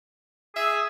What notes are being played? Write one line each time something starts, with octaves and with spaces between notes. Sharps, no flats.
G#4 E5 E6